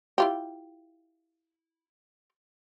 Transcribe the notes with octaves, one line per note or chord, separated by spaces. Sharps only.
E4 F4 G4